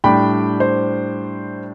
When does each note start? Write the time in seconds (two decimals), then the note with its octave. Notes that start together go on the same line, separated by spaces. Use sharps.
0.04 A2 G3 D4 G5 B5
0.60 C5